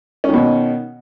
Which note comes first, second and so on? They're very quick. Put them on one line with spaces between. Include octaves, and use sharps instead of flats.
C#4 D#3 B2